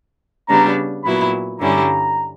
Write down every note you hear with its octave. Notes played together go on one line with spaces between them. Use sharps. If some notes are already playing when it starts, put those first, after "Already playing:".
C#3 G3 B3 D4 A#5
A#2 F#3 B3 E4 B5
G2 D3 G3 C#4 E4 A#5